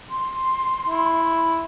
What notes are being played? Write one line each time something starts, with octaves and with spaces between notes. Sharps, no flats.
C6
E4